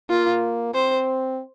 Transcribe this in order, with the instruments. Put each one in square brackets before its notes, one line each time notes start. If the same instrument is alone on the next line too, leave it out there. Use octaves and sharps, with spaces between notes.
[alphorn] A#3 [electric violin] F4
[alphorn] C4 [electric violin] C5